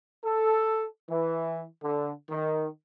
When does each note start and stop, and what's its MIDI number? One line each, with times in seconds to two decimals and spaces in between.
0.24 0.86 69
1.10 1.64 52
1.83 2.12 50
2.30 2.68 51